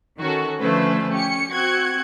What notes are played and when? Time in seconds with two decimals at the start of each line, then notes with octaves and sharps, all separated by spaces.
0.18 D#3 C#4 F#4 A4
0.59 D3 F3 A3 C#4 B4 C5
1.10 C#4 G4 C#7
1.51 C4 F#4 F#6 G#6 C#7